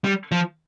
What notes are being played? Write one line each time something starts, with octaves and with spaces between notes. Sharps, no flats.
G3
F3